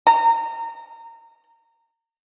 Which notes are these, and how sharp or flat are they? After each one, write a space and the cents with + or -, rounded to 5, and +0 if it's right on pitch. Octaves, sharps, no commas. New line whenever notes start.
A#5 -25